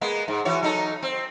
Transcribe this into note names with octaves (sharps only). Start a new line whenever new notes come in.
G#3 A#3 B3
G#2
E3 F#4 C#5
F#3 D#4 A4
C4